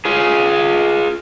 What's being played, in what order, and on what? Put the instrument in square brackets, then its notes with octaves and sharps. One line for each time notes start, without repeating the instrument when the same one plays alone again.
[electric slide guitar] F4 G#4